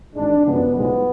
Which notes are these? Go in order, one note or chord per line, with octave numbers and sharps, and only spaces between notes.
G#1 G#2 G#3 D4
F#2 C#3 F3 G#3 B3
B1 A2 F3 G#3 B3